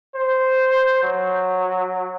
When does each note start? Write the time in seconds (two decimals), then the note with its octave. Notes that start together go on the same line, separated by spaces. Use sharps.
0.15 C5
1.03 F#3